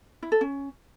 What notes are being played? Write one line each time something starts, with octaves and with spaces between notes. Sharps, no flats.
E4
A4
C#4